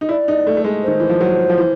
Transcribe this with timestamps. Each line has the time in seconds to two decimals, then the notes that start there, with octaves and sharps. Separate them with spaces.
0.01 D#4
0.09 E4 D5
0.28 D#4
0.47 A3
0.57 A3
0.64 G#3
0.83 D#3 C5
1.00 E3
1.10 F3
1.21 F#3
1.50 F3
1.58 E3